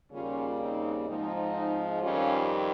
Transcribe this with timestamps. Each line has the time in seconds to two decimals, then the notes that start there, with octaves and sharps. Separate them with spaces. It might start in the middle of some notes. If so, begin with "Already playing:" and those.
0.12 D#2 C#3 G3 A#3 C#4 F4
0.60 C4 D#4
1.07 G#2 F3 G#3 C4 D#4
2.03 F2 D#3 G3 C#4 F4